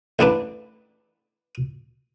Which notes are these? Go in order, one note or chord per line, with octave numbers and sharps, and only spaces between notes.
A1 G3 D4 B4